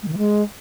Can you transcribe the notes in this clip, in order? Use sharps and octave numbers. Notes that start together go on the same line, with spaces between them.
G#3
D#3
E3
G#3